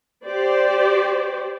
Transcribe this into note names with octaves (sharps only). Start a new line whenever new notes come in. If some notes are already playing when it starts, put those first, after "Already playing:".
G4 C5 D5